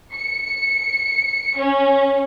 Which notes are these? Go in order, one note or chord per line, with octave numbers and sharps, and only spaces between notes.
C#7
C#4